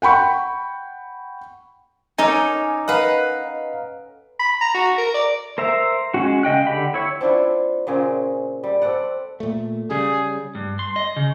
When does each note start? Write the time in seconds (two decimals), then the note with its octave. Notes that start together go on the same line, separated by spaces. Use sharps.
0.02 F#5 G5 B5 C#6
2.18 C#4 D#4 A4 C#5 G#5 D6
2.88 B4 D#5 F5 F#5 A#5
4.39 B5
4.62 A#5
4.75 F#4
4.98 A#4
5.14 D5
5.58 A#4 C5 E5 A#5
6.14 G#3 C#4 F#4
6.43 C#3 D#5 G5 F#6
6.67 D3 G4 B5
6.94 E4 C#5
7.21 C4 D4 E4 F4
7.87 A#2 C#3 C4 G#4
8.63 G3
8.82 C4 A4 D5 F#5
9.40 A#2 A3
9.90 C#3 G3 G#4
10.55 G2
10.79 C6
10.96 D#5
11.16 C#3